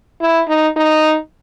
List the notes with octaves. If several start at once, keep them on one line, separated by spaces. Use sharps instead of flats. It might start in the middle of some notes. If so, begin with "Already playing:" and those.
E4
D#4
D#4